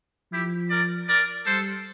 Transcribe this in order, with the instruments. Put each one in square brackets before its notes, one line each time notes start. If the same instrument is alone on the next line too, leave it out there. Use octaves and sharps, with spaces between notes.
[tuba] F3 [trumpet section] E4 G4
[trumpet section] A#4 D5
A#4 D5
[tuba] G3 [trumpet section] A4 C5